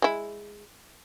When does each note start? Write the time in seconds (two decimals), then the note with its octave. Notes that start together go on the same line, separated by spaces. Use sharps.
0.02 G#3 E4